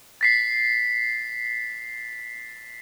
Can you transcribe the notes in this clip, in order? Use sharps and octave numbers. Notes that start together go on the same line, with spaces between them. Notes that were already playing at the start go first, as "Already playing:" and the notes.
A6 B6 C7